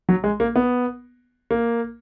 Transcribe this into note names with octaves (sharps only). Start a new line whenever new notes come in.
F#3
G#3
A#3
B3
A#3